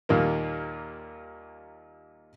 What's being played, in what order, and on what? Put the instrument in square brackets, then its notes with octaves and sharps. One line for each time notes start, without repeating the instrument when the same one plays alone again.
[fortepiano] D#2 A#2 G3 A#3